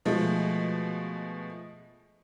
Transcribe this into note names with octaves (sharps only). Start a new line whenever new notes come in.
B2 F3 G#3 A3